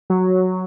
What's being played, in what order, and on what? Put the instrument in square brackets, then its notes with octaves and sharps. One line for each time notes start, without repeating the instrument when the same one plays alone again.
[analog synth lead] F#3